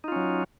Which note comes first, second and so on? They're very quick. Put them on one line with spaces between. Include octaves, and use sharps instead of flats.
D#4 F4 C#4 F#3